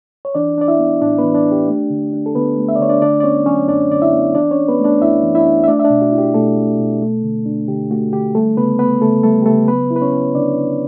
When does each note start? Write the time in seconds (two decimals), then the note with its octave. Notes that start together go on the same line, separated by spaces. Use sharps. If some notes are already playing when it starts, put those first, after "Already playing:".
0.25 C#5
0.35 E3 D4 D5
0.58 D4 D5
0.68 E4 E5
0.79 B3
1.01 A2 D4 D5
1.18 B3 B4
1.24 E3
1.34 D4 D5
1.46 D4
1.52 G4
1.68 A3
1.90 D3
2.13 D4
2.26 A4
2.35 D3 B3 B4
2.57 A3
2.69 E5
2.76 D5
2.80 D3 C#5
2.89 D4 D5
3.01 D3 D4 D5
3.20 D5
3.23 B3 C#4 C#5
3.46 F#3 C#4 C#5
3.68 F#2 D4 D5
3.90 D3 D5
4.02 E4 E5
4.12 B3
4.35 E3 D4 D5
4.51 C#4 C#5
4.57 D4
4.68 B3 B4
4.79 A3
4.85 D4 D5
5.02 F#2 E4 E5
5.24 E3
5.35 E4 E5
5.46 D4
5.64 E5
5.68 A3 D4 D5
5.79 E5
5.84 D4 D5
5.90 B2
6.02 F#4
6.12 E4
6.18 G4
6.34 B2 A3 A4
6.57 A3
6.79 B2
7.02 A3
7.23 D3
7.45 D4
7.68 D3 G4
7.91 A3 F#4
8.13 D3 G4
8.35 G3 A3 A4
8.57 C#3 B3 B4
8.79 B3 B4
9.01 C#3 A3 A4
9.23 G3 A3 A4
9.42 G4
9.46 C#3 A3 A4
9.68 F#3 B3 B4
9.90 E4
9.96 B4
10.02 C#4 C#5
10.13 C#4
10.35 D3 D4 D5